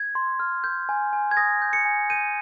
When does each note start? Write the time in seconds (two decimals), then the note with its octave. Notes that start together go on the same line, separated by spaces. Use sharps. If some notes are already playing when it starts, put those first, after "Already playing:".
Already playing: G#6
0.15 C6
0.40 F6
0.64 G6
0.89 G#5
1.13 G#5
1.31 G#6
1.37 D#6 A#6
1.62 G6
1.73 C#7
1.85 G#5
2.10 G6 D#7